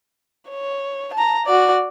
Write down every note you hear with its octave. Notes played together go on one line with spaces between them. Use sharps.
C#5
A5 A#5
F#4 D5